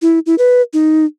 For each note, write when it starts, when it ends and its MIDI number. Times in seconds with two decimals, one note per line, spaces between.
0.02 0.19 64
0.26 0.35 64
0.38 0.62 71
0.73 1.05 63